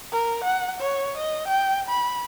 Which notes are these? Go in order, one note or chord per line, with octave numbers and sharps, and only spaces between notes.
A#4
F#5
C#5
D#5
G5
B5